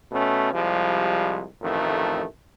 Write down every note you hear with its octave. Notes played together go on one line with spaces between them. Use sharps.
B2 A3 C#4
C2 F3 G3 G#3
A1 F2 D#3 A3